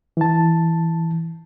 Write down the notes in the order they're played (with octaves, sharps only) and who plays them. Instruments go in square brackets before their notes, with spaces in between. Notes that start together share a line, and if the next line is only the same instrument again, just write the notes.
[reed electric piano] E3 A5